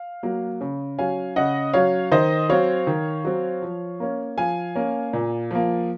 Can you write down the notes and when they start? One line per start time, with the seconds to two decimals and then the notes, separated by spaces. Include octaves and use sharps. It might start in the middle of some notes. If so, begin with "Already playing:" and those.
Already playing: F5
0.23 F#3 A#3
0.61 C#3
0.98 F#3 C#4 F5 G#5
1.36 C#3 D#5 F#5
1.73 F#3 C#4 C#5 F5
2.11 D#3 C5 D#5
2.50 F#3 C4 C#5 F5
2.87 D#3
3.25 F#3 C4
3.62 F3
4.00 A#3 C#4
4.38 F3 F5 G#5
4.75 A#3 C#4
5.13 A#2
5.51 F3 A#3